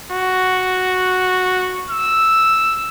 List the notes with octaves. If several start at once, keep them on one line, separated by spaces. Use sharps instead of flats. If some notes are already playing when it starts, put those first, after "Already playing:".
F#4
E6